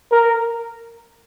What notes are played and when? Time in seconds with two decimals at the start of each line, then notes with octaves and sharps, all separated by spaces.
0.12 A#4